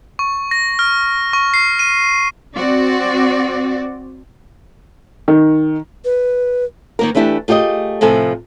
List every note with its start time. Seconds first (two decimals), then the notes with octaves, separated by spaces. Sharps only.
0.19 C#6
0.51 A#6
0.79 F6
1.33 C#6
1.54 C7
1.79 D#7
2.55 C4 F#4 D5
5.28 D#3
6.05 B4
6.99 D#3 A#3 A#4
7.15 E3 A3 D4 E4 G4
7.48 A3 F4 G4 G#4 D#5
8.01 A2 C3 F3 A4 G#5